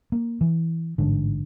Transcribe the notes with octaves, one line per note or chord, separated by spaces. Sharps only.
A#3
E3
A1 G#2 D3